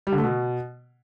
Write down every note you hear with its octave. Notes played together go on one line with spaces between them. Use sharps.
G3
D3
A3
B2